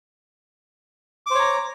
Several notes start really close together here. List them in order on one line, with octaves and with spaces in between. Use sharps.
D6 C5 C#5 A#5